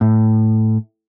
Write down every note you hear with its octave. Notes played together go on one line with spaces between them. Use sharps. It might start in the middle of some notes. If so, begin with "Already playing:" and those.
A2